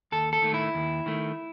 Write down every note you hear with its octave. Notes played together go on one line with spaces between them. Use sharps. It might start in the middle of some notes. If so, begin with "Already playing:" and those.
D#2 A4
A4
D#3 A3
E4
D#2
D#3 A3